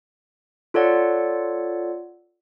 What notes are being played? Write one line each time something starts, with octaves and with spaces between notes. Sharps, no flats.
F4 A4 C#5 D5 F#5